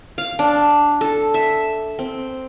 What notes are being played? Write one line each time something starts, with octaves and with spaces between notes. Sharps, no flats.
F5
D4
A4
E5
C4